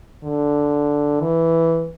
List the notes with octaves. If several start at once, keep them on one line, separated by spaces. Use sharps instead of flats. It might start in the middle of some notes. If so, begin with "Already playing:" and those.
D3
E3